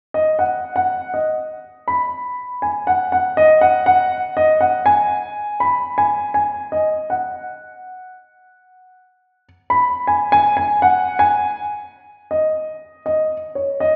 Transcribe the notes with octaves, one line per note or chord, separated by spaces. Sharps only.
D#5
F#5
F#5
D#5
B5
G#5
F#5
F#5
D#5
F#5
F#5
D#5
F#5
G#5
B5
G#5
G#5
D#5
F#5
B5
G#5
G#5
G#5
F#5
G#5
D#5
D#5
C#5
D#5